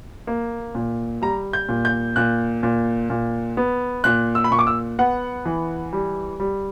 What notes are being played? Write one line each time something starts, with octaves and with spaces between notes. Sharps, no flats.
A#3
A#2
G3 A#5
G6
A#2
G6
A#2 F#6
A#2
A#2
B3
A#2 F#6
E6
B5
A#2 C#6
D6
E6
B3 F#5
E3
G3
G3